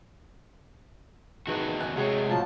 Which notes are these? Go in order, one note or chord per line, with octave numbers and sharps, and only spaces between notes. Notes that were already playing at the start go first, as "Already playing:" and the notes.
E2 D#3 D#4 F#4 G#4 B4
G#5 F#6
C3 G#3 F#4 G#4 C#5
A2 F3 F#3 F4 A5